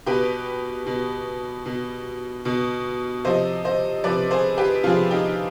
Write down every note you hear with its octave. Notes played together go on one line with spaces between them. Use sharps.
B2 G4 B4
B2
B2
B2
C3 F3 C5 D#5
C5 D#5
C3 F3 B4 D5
G#4 C5
G4 B4
C3 F3 F4 G#4
D#4 G4